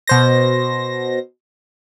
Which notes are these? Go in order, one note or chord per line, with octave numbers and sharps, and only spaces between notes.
B2 C5 A#6